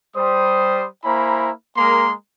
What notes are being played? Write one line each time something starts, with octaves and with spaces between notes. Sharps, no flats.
G3 C5 D#6
A#3 E4 C5 G#5 A#5 B5
G#3 A#3 G#4 A#4 A#5 C6